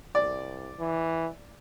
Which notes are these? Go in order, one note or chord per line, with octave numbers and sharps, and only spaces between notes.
C2 D5
E3